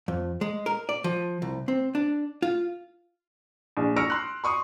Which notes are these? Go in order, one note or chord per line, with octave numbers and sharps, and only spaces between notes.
F2
G#3
A#4
D5
F3
C2
C4
D4
F4
A#1
C#6 E6 F6 A#6 C#7 D7
C6 F#6
C6 C#6 D#6